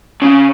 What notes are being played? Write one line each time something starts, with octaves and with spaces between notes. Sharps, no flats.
C#3